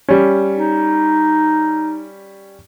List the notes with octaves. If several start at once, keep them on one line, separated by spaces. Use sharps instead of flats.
G3 C#4
D#4